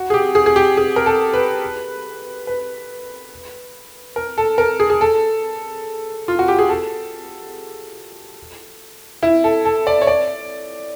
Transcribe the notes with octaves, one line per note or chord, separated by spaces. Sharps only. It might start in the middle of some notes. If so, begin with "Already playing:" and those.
Already playing: F#4
G#4
G4
G#4
G#4
G4
G#4
A#4
A4
B4
B4
A#4
A4
A#4
G#4
G#4
A4
F4
F#4
G4
G#4
A4
E4
A4
A4
D5
C#5
D5